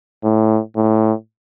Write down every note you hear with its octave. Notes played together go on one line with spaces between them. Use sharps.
A2
A2